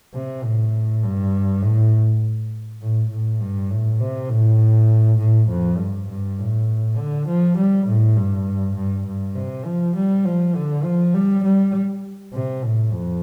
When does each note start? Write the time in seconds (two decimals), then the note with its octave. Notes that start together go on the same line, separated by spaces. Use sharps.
0.14 C3
0.44 A2
1.03 G2
1.62 A2
2.82 A2
3.10 A2
3.41 G2
3.71 A2
4.00 C3
4.30 A2
5.19 A2
5.49 F2
5.78 G2
6.09 G2
6.39 A2
6.97 D3
7.28 F3
7.58 G3
7.87 A2
8.17 G2
8.76 G2
9.07 G2
9.35 C3
9.65 F3
9.96 G3
10.25 F3
10.56 D3
10.84 F3
11.14 G3
11.44 G3
12.34 C3
12.64 A2
12.93 F2